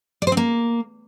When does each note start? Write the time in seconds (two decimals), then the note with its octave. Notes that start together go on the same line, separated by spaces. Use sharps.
0.22 D5
0.27 C5
0.32 C4
0.37 A#3